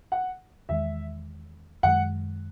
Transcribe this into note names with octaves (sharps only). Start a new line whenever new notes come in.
F#5
E2 D#3 G#3 E5
F#2 D#3 G#3 F#5